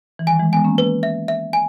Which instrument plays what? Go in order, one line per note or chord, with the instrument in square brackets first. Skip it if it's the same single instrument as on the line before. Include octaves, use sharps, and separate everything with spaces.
[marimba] E3
[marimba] D#3 G3 [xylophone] G#5
[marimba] E3 G#3
[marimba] G#3 B3 [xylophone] G#5
[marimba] A#3 C#4
[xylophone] B4
E5
E5
G#5